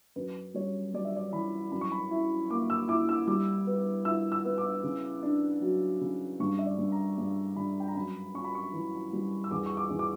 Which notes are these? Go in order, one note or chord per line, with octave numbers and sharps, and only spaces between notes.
F#2 B4
G3 C#5
G3 D5
E5
D5
E3 B5
F#2 B5
C#6
B5
E4
A#3 D6
E6
E4 D6
E6
G3 D6
B3
E4 E6
E6
B3
D6
C#3
D4
F#3
C#3
G2 C#6
E5
D5
G2
A#5
G2
G2 B5
G5
A#5
F#2 B5
C#4 C#6
B5
C#6
E3
G3
E6
E2 D6
C#6
D6
E2
D6